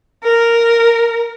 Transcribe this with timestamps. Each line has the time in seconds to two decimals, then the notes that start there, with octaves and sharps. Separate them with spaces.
0.24 A#4